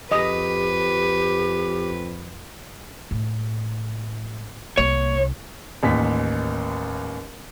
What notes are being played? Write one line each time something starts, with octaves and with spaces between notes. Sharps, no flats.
F2 G4 B4 D#5 D#6
A2
C2 A#3 C#5
A1 D#2 B6